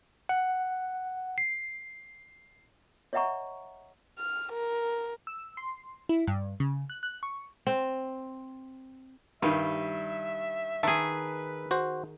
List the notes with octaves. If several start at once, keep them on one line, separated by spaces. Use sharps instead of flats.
F#5
C7
C#5 D#5 E5 F#5 A#5 C#6
F6
A#4
E6
C6
E4
G2
C#3
F#6
F#6
C#6
C4
G2 D#3 G3 E5
D#3 G#4 B4 E5 A5
F#4 C5